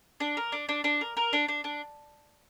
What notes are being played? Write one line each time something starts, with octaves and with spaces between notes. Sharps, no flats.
D4
A#4
D4
D4
D4
A#4
A#4
D4
D4
D4